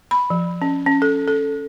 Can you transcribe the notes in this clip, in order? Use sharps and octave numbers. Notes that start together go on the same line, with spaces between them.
B5
F3
C#4
C#4
A4
A4